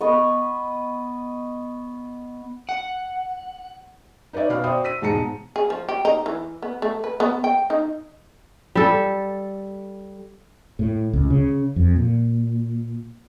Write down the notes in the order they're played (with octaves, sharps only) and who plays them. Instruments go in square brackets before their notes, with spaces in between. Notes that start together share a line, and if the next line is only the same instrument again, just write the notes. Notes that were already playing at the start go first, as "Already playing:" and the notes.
[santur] B3 D#5 C#6
[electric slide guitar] F#5
[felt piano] D#4 B4 C#5 D5 E5
B2 F5 B5 F6
F#4 C5 D5 E5 G5 D#6
E6 B6 D#7
E1 G#2 G#3 A5 A#5 C#7
[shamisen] G#4
F3
G4
D#4
E3
B3
A3
B4
B3
G5
D#4
[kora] G3 A4
[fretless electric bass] A2
C#2
C#3
F2
A#2